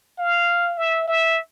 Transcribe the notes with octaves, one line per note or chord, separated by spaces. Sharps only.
F5
E5
E5